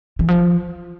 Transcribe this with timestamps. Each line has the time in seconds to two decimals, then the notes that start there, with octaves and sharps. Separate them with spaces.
0.19 E3
0.28 F3